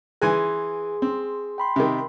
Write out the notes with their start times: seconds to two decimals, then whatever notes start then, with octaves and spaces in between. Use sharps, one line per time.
0.22 E3 G#4 G#5 C6 F#6
1.02 C4
1.58 G5 B5 C6
1.76 C3 D#3